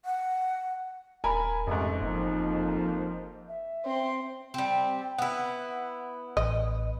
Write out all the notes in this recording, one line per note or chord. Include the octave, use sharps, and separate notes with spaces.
F#5
D#1 A#4 G#5 B5
A1 F2 G#2 C3 A3
F#1 F2 F3 A#3 D#4
E5
C4 C6
G3 C4
B3 E4 F#5
A1 D#5